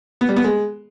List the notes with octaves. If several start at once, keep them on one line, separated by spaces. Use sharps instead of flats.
B3
G3
B3
G#3